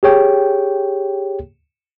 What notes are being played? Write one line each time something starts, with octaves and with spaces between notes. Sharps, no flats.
G4 G#4 C#5 G5